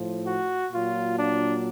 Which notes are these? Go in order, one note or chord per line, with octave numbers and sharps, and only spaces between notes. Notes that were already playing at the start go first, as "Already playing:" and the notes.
Already playing: A2 F3
F#4
A#2 F#3 F4
D4